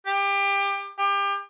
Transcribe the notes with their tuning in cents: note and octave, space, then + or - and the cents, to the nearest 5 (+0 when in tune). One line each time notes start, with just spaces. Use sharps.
G4 +25
G4 +30